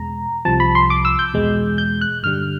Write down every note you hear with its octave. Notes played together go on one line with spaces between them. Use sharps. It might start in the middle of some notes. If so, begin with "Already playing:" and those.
Already playing: E2 B2 G#3 A#5
C2 C3 F3 A5
B5
C6
D6
E6
G6
E2 B2 G#3
G6
F#6
G2 D3 G3 F6